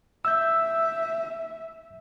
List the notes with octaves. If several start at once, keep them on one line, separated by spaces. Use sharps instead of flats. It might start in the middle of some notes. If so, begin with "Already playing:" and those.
E5 E6 G6